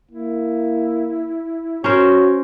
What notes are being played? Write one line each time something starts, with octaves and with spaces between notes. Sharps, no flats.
A#3 E4
C#4 F#4 A#4 C5 C#5